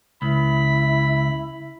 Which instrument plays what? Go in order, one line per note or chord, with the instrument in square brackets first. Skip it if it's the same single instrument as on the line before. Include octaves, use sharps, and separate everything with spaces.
[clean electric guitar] C#2 [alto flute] E4 [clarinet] B5